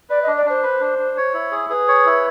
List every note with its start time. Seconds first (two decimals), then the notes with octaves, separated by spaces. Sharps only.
0.10 B4 D5
0.23 D#5
0.27 D4
0.37 D5
0.46 D4 C5
0.63 B4
0.81 D4
0.99 D4
1.17 C#5
1.34 E4
1.51 G#4
1.70 G#4 B4
1.88 C#5
2.06 E4